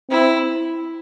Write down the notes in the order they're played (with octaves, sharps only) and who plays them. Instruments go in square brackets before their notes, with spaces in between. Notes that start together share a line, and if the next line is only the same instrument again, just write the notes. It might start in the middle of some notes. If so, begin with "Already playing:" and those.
[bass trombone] C4 [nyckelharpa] E4